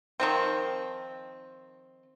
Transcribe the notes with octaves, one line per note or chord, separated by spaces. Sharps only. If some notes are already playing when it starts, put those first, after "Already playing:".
D#3 F3 C4